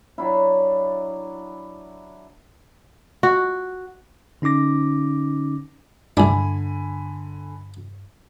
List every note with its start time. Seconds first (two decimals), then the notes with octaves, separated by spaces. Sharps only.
0.18 F#3 D4 E4
3.23 F#4
4.42 D3 C#4 D#4 D6 A#6
6.17 C2 G2 D3 D4 G#5 B5